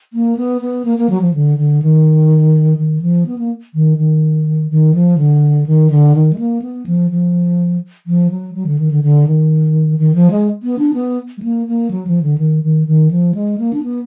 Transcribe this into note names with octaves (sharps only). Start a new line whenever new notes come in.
A#3
B3
B3
A#3
A#3
F#3
F3
D3
D3
D#3
D#3
F3
B3
A#3
D#3
D#3
D#3
F3
D3
D#3
D3
D#3
G#3
A#3
B3
F3
F3
F3
F#3
F#3
D3
D#3
D3
D3
D#3
D#3
F3
G#3
B3
D4
B3
G#3
A#3
A#3
F#3
F3
D3
D#3
D#3
D#3
F3
G#3
A#3
D4
B3